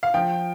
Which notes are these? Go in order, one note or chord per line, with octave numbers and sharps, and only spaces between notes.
F5
F3 G5